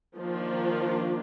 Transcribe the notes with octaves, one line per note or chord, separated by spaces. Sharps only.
D#3 F3 A#3 D4 F4